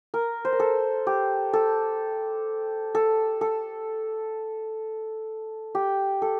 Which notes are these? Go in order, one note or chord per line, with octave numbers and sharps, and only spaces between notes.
A#4
C5
A#4
A4
G4
A4
A4
A4
G4
A4